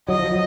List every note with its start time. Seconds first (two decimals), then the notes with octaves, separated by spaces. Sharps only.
0.08 F#3 D#5
0.19 F3
0.31 F#3